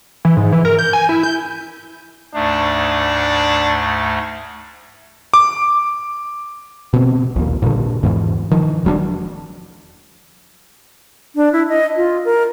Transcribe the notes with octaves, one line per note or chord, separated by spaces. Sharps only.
E3
G#2
E3
A#4
G6
G#5
E4
G6
D2 G#2 A3 D4
D6
B2 C4
A#1 D#2
G2 A#2 D3
E2 G#2 E3
D#3 F3
E1 F#3 G3 D4
D4
E4
D#5
F4
A#4